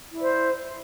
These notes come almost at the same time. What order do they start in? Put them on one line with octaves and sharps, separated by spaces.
E4 D5 C5